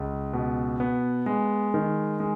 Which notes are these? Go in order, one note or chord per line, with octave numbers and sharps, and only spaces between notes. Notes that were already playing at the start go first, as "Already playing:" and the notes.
Already playing: C#2
B2
B3
G#3
D#3
G#3